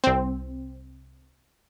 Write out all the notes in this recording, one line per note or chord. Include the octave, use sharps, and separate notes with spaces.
C2 C4